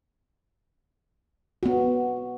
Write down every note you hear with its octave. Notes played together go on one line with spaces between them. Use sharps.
B3 F#4